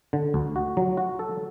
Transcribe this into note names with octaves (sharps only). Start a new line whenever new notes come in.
D3
D2
F#4
F#3
F#4
A4